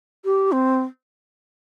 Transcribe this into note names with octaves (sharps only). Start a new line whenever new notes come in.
G4
C4